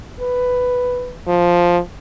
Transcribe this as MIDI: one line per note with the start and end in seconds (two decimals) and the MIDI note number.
0.20 1.14 71
1.27 1.79 53